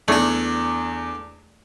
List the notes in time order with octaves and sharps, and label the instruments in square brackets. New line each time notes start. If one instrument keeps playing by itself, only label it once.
[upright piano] E2 G#6 [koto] A3 [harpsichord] D4 A4